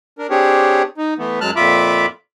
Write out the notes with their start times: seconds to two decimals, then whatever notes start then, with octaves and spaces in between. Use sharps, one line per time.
0.19 D4 A#4
0.30 C4 D4 G4 G#4 C#5
0.98 D#4
1.19 E3 A3 B3
1.41 F#2 F#3 G#3 A5 F6 F#6
1.56 F2 A#2 F4 E5 B5 D6